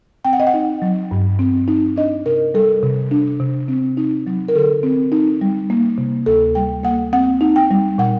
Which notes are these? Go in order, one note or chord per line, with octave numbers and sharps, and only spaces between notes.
C4 G5
F#5
D#5
F#5
D#4
F#3
G2
C4
D#4
D4 D#5
C3 A#4
G3 A4
C3
D4
C3
C4
D#4
F#3
A#4
D3 A4
C4
D#4
G3
A#3
C3
D2 A4
G3 G5
A#3 F#5
C4 F#5
D#4
G5
G3
A#2 F#5